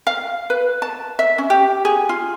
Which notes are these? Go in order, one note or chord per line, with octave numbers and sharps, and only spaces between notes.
F5
B4
A5
E5
C#4
G4
G#4
F4